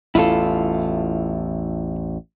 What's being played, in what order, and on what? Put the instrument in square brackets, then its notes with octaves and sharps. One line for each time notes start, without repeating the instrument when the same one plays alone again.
[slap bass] A1 E2 [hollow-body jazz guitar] E4 F4 A4